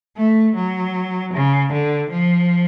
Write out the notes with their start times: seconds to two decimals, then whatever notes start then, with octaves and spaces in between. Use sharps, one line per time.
0.17 A3
0.55 F#3
1.34 C#3
1.73 D3
2.10 F3